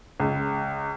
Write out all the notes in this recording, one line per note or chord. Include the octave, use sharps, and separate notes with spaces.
C#2